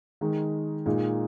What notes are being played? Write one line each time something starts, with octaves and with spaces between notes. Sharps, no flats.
D#3 G#3 D#4
A#2 G#3 D#4